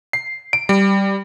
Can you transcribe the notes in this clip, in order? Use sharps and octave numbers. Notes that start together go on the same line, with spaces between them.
C7
D7
G3